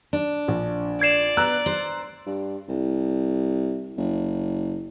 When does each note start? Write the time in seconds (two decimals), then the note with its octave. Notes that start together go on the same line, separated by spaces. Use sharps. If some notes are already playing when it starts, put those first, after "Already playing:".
0.13 D4
0.48 A#1
1.01 D5 G#6 C7 E7
1.37 B3 A#5 E6 F#6
1.66 C5
2.26 G2
2.69 C2
3.97 F#1